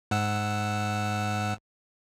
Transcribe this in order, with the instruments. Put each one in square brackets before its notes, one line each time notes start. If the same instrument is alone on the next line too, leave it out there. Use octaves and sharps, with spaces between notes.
[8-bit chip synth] G#2 F#5 E6